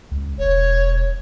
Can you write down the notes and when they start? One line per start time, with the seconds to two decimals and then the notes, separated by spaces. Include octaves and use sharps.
0.11 C#2
0.39 E1 C#5